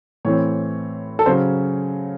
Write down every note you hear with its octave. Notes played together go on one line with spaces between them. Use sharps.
A2 E3 C4 C#5
A4
C#3 F#3 C#4 C5